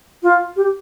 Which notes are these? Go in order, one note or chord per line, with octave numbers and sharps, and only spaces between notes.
F4
G4